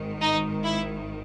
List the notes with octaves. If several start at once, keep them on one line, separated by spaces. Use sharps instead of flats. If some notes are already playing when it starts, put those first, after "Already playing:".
Already playing: G#1 G#2 D#3
D#4
E4